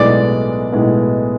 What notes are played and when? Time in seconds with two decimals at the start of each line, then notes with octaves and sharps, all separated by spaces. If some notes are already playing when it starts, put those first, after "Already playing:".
Already playing: B1 A2 G#3 B3 D5
0.72 B1 A2 G#3 B3